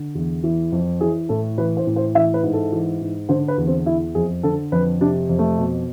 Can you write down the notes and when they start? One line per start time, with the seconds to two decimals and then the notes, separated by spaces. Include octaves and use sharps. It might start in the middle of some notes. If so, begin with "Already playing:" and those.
Already playing: D3
0.15 E2
0.43 E3
0.72 F2
1.01 E3 G#4
1.29 A2 A4
1.58 E3 B4
1.77 C5
1.87 A2
1.96 C5
2.15 E3 E5
2.34 B4
2.43 G#2
2.53 A4
2.72 E3
3.01 G#2
3.29 D3 C5
3.48 B4
3.58 E2
3.67 C4
3.86 E3 E4
4.15 F2 G#4
4.43 D3 A4
4.72 F2 B4
5.01 C3 D4
5.29 F2
5.39 A3
5.58 B2